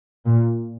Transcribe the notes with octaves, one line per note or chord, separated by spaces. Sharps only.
A#2